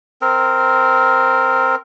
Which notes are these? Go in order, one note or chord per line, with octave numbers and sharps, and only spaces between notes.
C4 A#4